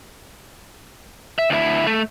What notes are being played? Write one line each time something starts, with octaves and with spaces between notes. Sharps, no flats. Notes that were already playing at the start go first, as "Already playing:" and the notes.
E5
D2 E4
A3